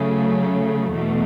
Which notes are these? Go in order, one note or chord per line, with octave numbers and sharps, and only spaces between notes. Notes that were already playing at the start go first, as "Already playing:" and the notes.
Already playing: C#3 F#3 A3
E2 B2 A3